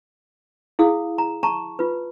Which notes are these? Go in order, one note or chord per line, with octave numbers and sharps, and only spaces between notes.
E4 G#4 F5 D#6
A#5
A5 A#5 C#6
F4 B4